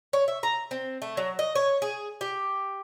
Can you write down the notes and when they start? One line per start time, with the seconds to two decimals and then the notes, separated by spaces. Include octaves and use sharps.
0.13 C#5
0.28 E5
0.43 A#5
0.71 C4
1.02 A3
1.17 F#3
1.39 D#5
1.55 C#5
1.82 G#4
2.21 G4